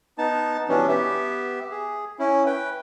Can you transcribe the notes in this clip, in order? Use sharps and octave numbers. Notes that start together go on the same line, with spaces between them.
B3 D#4 A5
B2 E3 G3 B3 C#4 D4
B3 G4 E5
G#4
C#4 E4
B4 G5